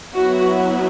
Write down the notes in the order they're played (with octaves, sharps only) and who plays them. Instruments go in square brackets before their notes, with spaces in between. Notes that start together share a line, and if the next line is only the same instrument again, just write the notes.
[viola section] F#3 B3 E4 F#4